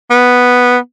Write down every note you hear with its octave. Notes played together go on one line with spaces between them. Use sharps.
B3